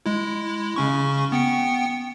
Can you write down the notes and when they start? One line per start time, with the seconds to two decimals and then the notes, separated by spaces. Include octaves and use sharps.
0.06 G#3 E4
0.76 C#3 C#4 C#6
1.32 B3 G5 C#7